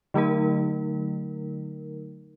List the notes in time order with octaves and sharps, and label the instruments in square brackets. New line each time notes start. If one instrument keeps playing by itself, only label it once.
[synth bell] D3 F#3 A3 D#4 A#4